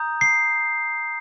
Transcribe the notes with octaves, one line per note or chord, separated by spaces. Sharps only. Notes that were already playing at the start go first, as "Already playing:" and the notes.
Already playing: A#5 D#6 G6
C7